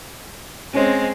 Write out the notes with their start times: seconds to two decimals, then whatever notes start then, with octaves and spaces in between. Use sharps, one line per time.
0.74 G#3 C4 C#4